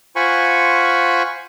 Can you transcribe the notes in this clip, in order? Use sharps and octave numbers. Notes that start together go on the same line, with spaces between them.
F4 C5 F#5 G#5 B5 C#6